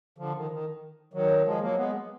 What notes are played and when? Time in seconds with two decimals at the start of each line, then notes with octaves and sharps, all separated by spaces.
0.18 D3 F3
0.35 D#3
0.51 D#3
1.14 D#3 F#3
1.45 F3 G#3
1.61 F#3 A#3
1.77 G#3 B3